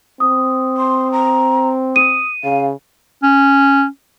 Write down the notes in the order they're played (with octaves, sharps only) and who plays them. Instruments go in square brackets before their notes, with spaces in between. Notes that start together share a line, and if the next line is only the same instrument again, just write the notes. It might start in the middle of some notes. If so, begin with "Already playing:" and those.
[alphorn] C4 [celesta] D#6
[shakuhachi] C6
A#5
[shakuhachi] D#6 [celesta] D#7
[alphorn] C#3 [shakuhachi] F5
[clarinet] C#4